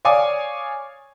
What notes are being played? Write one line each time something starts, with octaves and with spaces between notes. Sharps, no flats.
C#5 D5 F5 G#5 D6 D#6